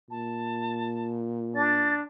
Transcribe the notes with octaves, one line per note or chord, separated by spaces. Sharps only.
A#2 A5
D4 A6